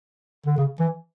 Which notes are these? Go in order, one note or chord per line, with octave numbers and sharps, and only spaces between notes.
D3
C#3
E3